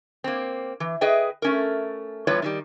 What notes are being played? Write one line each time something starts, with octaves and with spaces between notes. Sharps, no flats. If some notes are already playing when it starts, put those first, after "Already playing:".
A#3 C4
E3
G#4 B4 D#5 E5 G5
A3 C#4 A#4
E2 A2 G3 F4 B4 C#5
D#3 F#3 G3